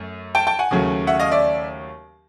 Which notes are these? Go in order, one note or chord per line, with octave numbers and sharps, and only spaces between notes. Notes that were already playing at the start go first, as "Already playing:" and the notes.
Already playing: F#2 A3
G5 A5
G5 A5
F#5 G#5
D#2 C#3 F#3 A3
E5 F#5
D#5 F5
D5 E5